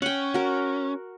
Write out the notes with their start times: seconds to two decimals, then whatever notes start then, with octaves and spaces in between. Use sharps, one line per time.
0.02 C#4 F#5 G5
0.34 F#4 A#4